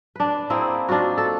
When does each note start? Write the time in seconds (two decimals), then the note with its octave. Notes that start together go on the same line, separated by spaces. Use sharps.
0.16 D4 B4
0.50 A#3 C4 E4 G#4
0.88 D4 D#4 F4 F#4
1.18 A4